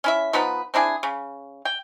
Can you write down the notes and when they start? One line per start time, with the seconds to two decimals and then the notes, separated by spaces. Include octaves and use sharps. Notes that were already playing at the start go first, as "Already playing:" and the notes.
0.04 C#4 E4 E5
0.33 F3 B3 D#4 B4
0.74 C4 D4 E4 G#4
1.03 C#3
1.65 G5